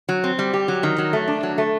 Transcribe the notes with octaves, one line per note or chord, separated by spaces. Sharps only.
F#3
C4
G3
G4
F#3
D#3
F#3
A3
D4
F#3
A3